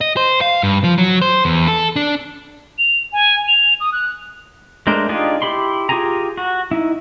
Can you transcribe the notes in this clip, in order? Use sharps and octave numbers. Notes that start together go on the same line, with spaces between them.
D#5
C5
F5
G2
F3
F#3
C5
E2
A4
D4
F7
G#5
F7
D#6
F#6
G#3 A3 D4 A#4 C5
D4 D#4 F4 G4 G#4
E4 G4 B5 C6
F4 G4 G#4 G#5 A#5
F#4
D#4 E4